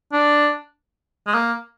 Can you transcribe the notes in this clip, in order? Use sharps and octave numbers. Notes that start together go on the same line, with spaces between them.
D4
G#3
A#3